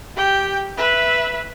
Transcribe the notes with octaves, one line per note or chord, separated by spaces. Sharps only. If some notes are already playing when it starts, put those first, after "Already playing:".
G4 G5
B4 E5